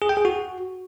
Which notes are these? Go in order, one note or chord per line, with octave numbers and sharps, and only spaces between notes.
G#4
G5
G#4
F#4